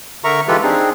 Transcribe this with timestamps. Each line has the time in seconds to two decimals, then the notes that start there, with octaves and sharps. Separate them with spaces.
0.24 D3 A#4 E5 A#5 C#6
0.48 E3 G#3 F4 G4 A4 B4
0.63 C4 D4 D#4 G#4